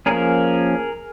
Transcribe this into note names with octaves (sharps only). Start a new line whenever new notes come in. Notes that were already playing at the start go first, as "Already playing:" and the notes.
F3 A#3 C#4 G#4 A#4